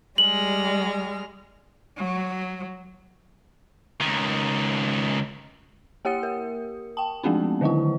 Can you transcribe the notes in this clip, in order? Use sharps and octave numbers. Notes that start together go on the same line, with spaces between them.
G3 G#3 F6 F#7
F#3
C#2 D#3
A#3 G4 F#5 D#6 C#7
A#4
G5 A5
F3 G#3 A3 B3 C4 D4
D3 D#3 F#3 A3 E4